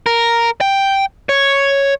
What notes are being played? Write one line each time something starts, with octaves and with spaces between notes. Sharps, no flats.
A#4
G5
C#5